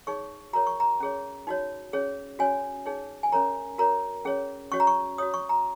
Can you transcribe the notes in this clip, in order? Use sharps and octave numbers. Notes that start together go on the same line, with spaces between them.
D#4 G#4 C#5 C#6
F#4 A#4 C#5 A#5
C#6
A#5
C#4 G#4 C#5
D#4 F#4 C#5
C#4 G#4 C#5
C#4 F#4 C#5 G#5
D#4 G#4 C#5
G#5
C#4 A#4 C#5 A#5
F#4 A#4 C#5 A#5
C#4 G#4 C#5
C#4 F#4 C#5 C#6
A#5
C#6
F#4 C#5 D#6
C#6
A#5